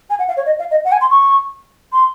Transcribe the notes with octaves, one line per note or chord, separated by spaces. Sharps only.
G#5
F#5
F5
C#5
D#5
F5
D#5
F#5
G#5
C6
C#6
C6